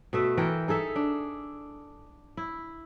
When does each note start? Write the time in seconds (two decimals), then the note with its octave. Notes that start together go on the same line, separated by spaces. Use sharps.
0.13 B2 A3 E5
0.37 E3 A4 A#4 G5
0.68 D#4 G#4 A4 E5
0.96 D4
2.37 E4